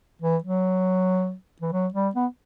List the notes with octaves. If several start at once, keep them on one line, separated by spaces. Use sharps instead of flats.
E3
F#3
E3
F#3
G3
B3